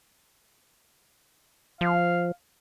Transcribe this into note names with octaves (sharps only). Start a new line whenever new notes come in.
F3 F5